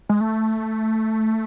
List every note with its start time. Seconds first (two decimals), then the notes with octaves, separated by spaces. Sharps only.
0.09 G#3
0.21 A3